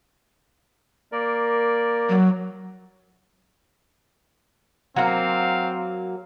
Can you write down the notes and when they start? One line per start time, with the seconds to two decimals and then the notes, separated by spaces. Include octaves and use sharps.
1.12 A#3 A#4 D5
2.09 F#3
4.96 F#3 A#3 C4 F5